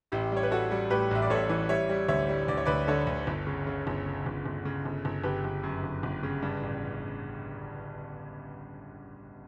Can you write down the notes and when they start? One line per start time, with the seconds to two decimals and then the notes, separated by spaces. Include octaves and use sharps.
0.12 A1 E4 G4
0.32 G3 C#5
0.43 B4
0.51 G3 F#4 A4
0.71 G3
0.90 A2 G4 B4
1.11 A1 E5
1.22 D5
1.30 A1 A4 C#5
1.49 E3
1.69 G3 C#5 E5
1.89 G3
2.08 D2 C#5 E5
2.29 G3
2.48 D2 D5
2.57 C#5
2.65 D2 B4 D5
2.88 D3 A4 C#5
3.07 D2
3.27 G1
3.47 C#3
3.67 C#3
3.87 G1
4.06 C#3
4.26 G1
4.46 G1
4.65 C#3
4.85 G1
5.05 G1
5.24 G1 G4 B4
5.44 G1
5.63 F#2
5.83 G1
6.03 G1
6.23 C#3
6.42 G2
6.61 A1